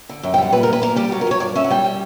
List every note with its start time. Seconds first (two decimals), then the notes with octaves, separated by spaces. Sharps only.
0.09 D3
0.23 F#2 G5
0.34 G5
0.38 G3 F#5
0.52 A#2 B4
0.63 A#4
0.68 A#2 B4
0.82 A#3 A#4
0.96 G3 G4
1.12 F#3 F#4
1.21 A#4
1.27 F#3 C#5
1.40 G2 D5
1.55 C#4 E5
1.64 F#5
1.70 G3 G5
1.84 G3